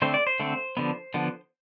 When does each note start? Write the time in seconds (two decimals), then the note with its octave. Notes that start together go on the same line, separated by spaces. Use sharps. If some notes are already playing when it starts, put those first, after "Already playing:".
0.02 D3 A3 C4 C5
0.14 D5
0.27 C5
0.40 D3 A3 C4
0.77 D3 F3 B3
1.14 D3 F3 B3